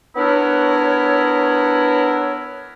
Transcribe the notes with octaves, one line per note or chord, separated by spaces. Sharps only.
B3 D4 E4 A#4 C#5